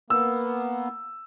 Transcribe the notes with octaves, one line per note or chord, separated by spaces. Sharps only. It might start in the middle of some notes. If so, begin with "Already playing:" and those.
A#3 B3 E6